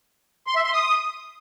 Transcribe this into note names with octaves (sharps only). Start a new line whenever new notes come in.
C6
E5
C6
D#6